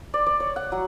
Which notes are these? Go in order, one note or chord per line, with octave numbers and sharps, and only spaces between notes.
D5
D5
C#5
F#5
F#3